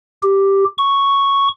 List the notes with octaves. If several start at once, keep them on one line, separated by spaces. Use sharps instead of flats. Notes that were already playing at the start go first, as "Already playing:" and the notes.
G4
C#6